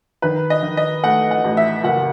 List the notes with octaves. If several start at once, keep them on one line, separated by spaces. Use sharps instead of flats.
D#3 B4
D#5
D#3
D#5
A3 F#5
F#5
A1
E5
F#1 F#5